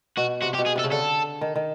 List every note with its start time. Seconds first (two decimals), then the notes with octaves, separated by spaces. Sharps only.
0.17 B2 F#4
0.42 C3 F#4
0.55 G4
0.59 B2
0.66 G#4
0.76 C3 A4
0.84 C#3
0.92 D3 A4
1.41 D#3
1.55 D#3